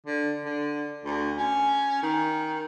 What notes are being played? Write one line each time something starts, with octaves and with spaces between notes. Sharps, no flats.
D3
D3
D2
C#4
D#3